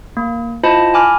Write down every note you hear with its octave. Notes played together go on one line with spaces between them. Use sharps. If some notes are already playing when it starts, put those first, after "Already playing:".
A#3
E4 F4 C5 D#5 A5 B5
G#5 B5 D6 F6